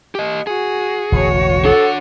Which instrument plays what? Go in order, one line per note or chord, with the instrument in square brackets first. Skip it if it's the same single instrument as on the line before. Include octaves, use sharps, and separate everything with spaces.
[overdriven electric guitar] G4 D#5
[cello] F#4 [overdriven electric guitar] G#4
[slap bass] E1 A1 D3 [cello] F#4 C#5
[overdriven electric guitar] D4 F#5 [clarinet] A4